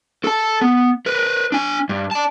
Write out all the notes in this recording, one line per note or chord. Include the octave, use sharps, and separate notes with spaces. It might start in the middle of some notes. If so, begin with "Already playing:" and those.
A4 A5
B3
A#4 B4
D4 G#5
G2
D5 A5